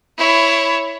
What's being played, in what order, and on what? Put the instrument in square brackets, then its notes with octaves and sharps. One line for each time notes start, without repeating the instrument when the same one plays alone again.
[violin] E4 C#5